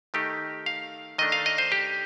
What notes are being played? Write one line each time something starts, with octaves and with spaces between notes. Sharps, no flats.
D#3 A3 D#4 G4
F5
D#3 A3 D4 D#5
F5
D#5
C5
G4